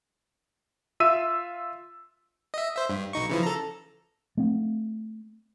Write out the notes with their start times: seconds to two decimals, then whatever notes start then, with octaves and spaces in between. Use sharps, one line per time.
1.00 F4 E5 E6 D#7
2.54 D#5 E5
2.76 C5 E5
2.90 G2
3.13 B1 D#4 C#6
3.29 C#3 E3 F3
3.43 A4 A#5
4.37 A3 C4